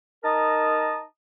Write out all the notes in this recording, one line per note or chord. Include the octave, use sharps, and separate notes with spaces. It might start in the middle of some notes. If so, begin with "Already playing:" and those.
D#4 A#4 D#5 A5 A#5 D#6